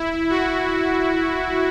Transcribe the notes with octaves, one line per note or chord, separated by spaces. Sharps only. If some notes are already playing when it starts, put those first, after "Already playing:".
Already playing: E4
F#4